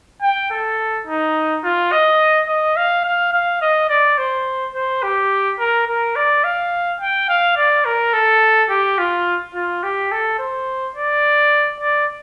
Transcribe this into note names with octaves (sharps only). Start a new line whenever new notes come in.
G5
A4
D#4
F4
D#5
D#5
F5
F5
F5
D#5
D5
C5
C5
G4
A#4
A#4
D5
F5
G5
F5
D5
A#4
A4
G4
F4
F4
G4
A4
C5
D5
D5